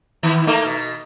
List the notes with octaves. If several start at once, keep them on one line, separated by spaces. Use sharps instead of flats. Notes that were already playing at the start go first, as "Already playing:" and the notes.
D#3 B3
A3 A#3 D#4
B2